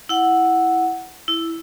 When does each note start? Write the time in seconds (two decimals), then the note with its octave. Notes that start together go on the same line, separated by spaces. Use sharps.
0.09 E4 F#5
1.28 E4